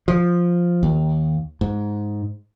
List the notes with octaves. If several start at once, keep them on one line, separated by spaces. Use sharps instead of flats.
F3
D#2
G#2